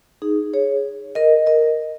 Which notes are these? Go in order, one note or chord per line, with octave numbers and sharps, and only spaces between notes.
D#4 G#4
G#4 C#5
A#4 D#5
A#4 D#5